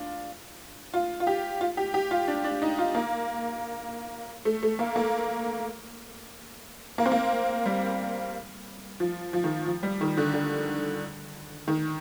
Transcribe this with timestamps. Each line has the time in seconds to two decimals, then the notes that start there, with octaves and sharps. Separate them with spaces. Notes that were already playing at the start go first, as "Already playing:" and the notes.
Already playing: D4 F4
0.94 F4
1.20 F4
1.27 G4
1.61 F4
1.77 G4
1.94 G4
2.11 F4
2.28 D4
2.44 D4
2.62 D#4
2.78 F4
2.95 A#3
4.45 A3
4.63 A3
4.79 A#3
4.96 A#3
6.98 A#3
7.06 C4
7.12 A#3
7.66 G3
9.00 F3
9.33 F3
9.44 D#3
9.66 F3
9.83 G3
10.01 D#3
10.17 D3
10.34 D3
11.68 D#3